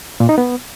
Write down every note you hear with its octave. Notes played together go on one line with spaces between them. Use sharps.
A#2
D#4
B3